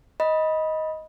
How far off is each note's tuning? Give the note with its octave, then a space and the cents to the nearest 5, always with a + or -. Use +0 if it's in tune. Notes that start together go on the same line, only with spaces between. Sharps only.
D#5 +10 B5 -15